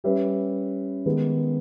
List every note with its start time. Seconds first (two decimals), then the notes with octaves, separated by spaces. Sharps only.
0.04 G3 C#4 G4 B4 E5
1.06 D#3 G#3 B3